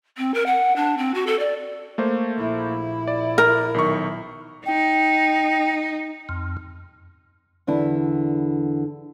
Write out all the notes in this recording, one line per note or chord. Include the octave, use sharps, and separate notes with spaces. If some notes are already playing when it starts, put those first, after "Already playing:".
C4
A#4
F#5
D4
C4
F#4
A4
D5
A3 A#3 C5
A#1 E4
D5
A#4
B1 D#3 C#6
D#4 G5
F2
E2 D3 D4 E4